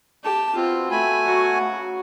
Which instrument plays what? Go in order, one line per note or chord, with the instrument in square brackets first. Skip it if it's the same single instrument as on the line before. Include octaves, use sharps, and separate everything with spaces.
[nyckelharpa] G4 A5
[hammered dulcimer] B2 [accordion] C4 [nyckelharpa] F4
[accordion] A3 G#5 [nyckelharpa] B5
[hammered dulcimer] F#3 C#6 [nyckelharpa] F#4
[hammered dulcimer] C#3